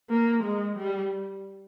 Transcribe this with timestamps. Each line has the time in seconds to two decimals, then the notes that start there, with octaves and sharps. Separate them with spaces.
0.10 A#3
0.44 G#3
0.77 G3